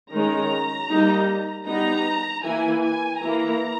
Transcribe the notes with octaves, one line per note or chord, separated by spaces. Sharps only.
D#3 G#3 C#4 A#5
G3 A#3 D#4
G3 B3 D#4 A#5
E3 A#3 E4 G#5
G#5
E3 A#3 E4 A#5